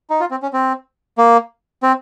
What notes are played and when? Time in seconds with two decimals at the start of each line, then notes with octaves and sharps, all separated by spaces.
0.10 D#4
0.20 F4
0.31 C4
0.42 C#4
0.53 C4
1.18 A#3
1.83 C4